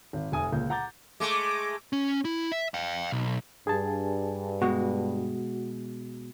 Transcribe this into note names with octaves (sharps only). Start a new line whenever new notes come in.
G#1
F1 G#5 D#6
C#2 A#2 G6
F#5 A#5 D6 G6 A6
G#3 A3 D6
C#4
E4
E5
F5 G5
B1
G2 G#4 G#5 A5
B2 G#3 F#4